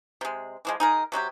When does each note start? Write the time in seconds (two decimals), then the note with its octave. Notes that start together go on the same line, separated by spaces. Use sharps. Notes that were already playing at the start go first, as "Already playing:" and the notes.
0.21 C3 G#3
0.65 E3 F3 G#3
0.80 D#4 G#4 A#4
1.12 C3 F#3 D#4 G4